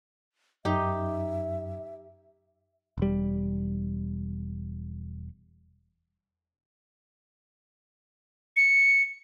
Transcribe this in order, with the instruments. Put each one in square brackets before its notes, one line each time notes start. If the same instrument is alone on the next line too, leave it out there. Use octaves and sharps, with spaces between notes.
[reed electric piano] F#2 [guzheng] D#4 G4 [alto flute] E5
[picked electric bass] E1 G3
[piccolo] C#7